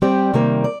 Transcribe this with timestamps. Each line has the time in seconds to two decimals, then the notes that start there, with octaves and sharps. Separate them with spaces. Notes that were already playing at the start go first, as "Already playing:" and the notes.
0.02 G3 C4 G4 D5
0.34 C3 D#3 G3 A#3
0.64 D5